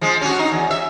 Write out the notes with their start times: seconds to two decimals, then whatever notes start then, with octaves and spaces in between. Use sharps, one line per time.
0.01 F3 G#3
0.21 C#4 F#4
0.39 D#4
0.52 E2
0.71 E5